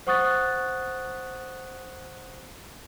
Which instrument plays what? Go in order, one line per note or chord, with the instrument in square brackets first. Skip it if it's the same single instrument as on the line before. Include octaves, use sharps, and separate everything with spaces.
[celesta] C5 F#5 C#6 D#6 F#6 A6